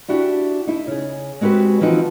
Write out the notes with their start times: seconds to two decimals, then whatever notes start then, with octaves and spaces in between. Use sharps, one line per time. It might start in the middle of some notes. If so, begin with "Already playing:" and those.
0.08 D4 E4 F#4 G4
0.67 D#4 E4
0.87 C#3 G#4
1.41 G#3 C4 F#4 G4 B4
1.81 E3 F3 C4 D#4 F#4